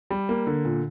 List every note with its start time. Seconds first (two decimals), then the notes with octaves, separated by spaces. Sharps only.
0.11 G3
0.29 A#3
0.47 D3
0.65 A#2